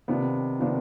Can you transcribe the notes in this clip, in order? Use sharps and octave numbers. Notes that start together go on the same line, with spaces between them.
C3 D#3 B3 D4 F4
C3 D#3 B3 D4 F4